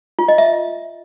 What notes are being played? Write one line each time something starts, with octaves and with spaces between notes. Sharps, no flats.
F4
D#5
E5